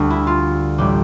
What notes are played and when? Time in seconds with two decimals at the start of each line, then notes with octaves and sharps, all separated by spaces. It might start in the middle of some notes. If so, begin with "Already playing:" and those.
Already playing: D2 D3 G3
0.10 E4
0.27 F4
0.78 A1 A2 G3 G4